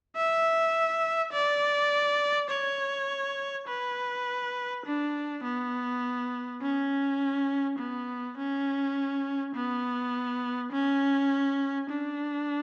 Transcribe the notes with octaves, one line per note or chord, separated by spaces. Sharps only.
E5
D5
C#5
B4
D4
B3
C#4
B3
C#4
B3
C#4
D4